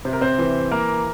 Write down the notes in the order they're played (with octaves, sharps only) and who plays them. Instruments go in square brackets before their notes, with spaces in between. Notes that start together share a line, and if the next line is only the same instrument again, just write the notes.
[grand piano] C3 C5
A#4
C4 C5
E3
A#3 A#4